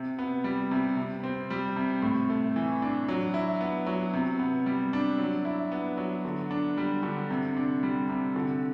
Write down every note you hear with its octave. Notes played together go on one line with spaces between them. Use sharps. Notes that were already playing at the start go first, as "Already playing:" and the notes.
Already playing: C3
B3
G3
C3
C3
C4
G3
C3
A2
A3
E3
D4
F#3
E4
B3
F#3
C3
B3
G3
D4
F#3
E4
B3
F#3
D3
D4
G3
D3
C3
D4
G3
C3
D3